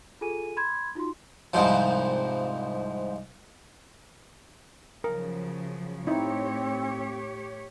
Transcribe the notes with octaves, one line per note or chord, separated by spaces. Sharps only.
F4 G#4 A4 G#5 D#7
B5 C6 G#6
D#4 F4 F#4 C6
C2 G#2 F3
C#3 F3 F#3 A#4
A2 C4 D#4 E4 G4 C#5